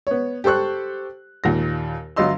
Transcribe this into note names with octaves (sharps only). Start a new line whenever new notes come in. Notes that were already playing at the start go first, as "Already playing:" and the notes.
B3 C#5
G4 A4 C5 C#6 F#6
D#2 A#2 A#6
G1 F#3 F4 D#5 C6 E6